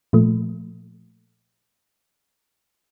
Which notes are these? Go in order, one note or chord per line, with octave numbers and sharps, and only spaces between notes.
A#2 F3 A3